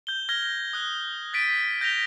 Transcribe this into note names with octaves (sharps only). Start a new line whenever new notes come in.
G6 G7
F6 G#6 A#6 G7
D#6 F#6
F#6 A6 B6 D7 D#7
G6 A#6 B6 F7 G7